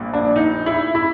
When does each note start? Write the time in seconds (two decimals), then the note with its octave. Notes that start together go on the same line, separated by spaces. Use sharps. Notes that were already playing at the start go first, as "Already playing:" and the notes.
Already playing: A#1 A#2 G3
0.13 D4
0.36 D#4
0.66 E4
0.95 E4